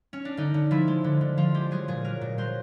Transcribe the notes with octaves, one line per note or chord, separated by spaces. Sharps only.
C#4
D4
D3 D#4
D3
F3 E4
G#3
D3
D3
F3 F4
G#3 G4
F#3 G#4
A#2 G#4
F#3 A#4
A#2
F#3 C5